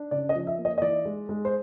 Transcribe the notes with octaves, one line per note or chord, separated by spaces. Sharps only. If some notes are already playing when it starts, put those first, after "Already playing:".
Already playing: D4
C#3 D5
D#5
F3
E5
A#3
D#5
D#5
E3 D5
G#3
G#3
C5